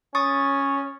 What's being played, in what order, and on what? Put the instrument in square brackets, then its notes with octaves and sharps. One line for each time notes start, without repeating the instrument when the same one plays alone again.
[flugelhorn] C#4 [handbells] C#6 D#6 A6